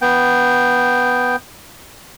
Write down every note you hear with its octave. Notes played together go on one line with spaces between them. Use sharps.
B3 G5